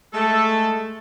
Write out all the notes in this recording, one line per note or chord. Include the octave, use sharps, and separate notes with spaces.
G#3 A3 A4